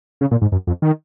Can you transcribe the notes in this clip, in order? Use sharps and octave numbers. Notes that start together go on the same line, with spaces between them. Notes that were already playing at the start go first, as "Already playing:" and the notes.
C#3
A#2
G#2
F#2
F2
D#3